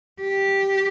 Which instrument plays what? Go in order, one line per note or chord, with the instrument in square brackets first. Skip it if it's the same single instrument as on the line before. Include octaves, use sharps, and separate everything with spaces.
[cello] G4